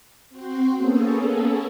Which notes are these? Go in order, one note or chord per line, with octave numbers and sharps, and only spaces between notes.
C4 F#4 C5
A#3 B3 C#4 G#4 A4